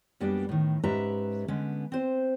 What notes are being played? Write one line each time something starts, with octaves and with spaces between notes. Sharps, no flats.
F#2 G3 A#3 B3 D4
A2 D#3
G#2 C#4 G4 B4 E5 A#5
D3 G#3 B3 C#4
C4 C5